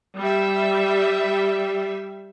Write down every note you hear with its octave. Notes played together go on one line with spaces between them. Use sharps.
G3 E5